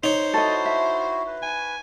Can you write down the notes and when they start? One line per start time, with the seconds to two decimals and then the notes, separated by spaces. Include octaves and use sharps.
0.04 D#4 C5 C#5
0.34 E4 F#4 A4 D#5
0.65 E5
1.27 B4
1.42 G#5